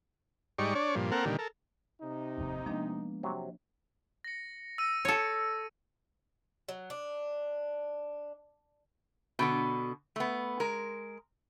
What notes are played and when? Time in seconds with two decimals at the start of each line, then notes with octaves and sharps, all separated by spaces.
0.58 G#2 G3 D#4 D5 C#6
0.75 D4 C#5 D5
0.95 G2 A#2 F3
1.12 A#3 C4 A4 A#4 F#5
1.25 A#2 D3 D#3 G3
1.39 A4 A#4
2.01 C3 D#4
2.38 F1 D#2 G#2
2.66 F3 G#3 A#3 B3 D4
3.23 C3 F#3
4.24 A#6 C#7
4.78 E6 A#6 D#7
5.05 A4 C#5
6.69 F#3
6.90 D4
9.39 B2 D3 B3
10.16 A3 B3
10.60 G#3 A#4